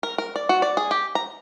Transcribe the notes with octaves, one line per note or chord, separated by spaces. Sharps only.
A#4
A#4
D5
F#4
D5
G#4
G4
A#5